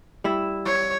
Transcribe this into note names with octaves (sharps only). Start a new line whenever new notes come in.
G3 E4 E5
C#5